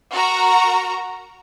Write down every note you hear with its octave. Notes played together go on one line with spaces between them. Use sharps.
F#4 A#4 A#5